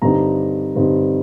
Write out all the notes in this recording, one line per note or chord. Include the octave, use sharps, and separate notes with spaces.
G2 D3 G3 C4 D#4 A#5
G2 D3 G3 C4 D#4